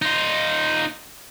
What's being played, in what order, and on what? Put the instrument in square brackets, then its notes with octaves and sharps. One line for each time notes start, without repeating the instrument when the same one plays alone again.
[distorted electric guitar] D#4 F4